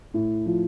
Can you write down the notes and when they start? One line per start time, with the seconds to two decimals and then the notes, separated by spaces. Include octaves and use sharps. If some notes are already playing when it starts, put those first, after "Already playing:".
0.14 A2
0.46 F3